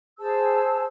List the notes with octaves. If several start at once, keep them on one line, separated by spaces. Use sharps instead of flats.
G#4 C5 A5 E6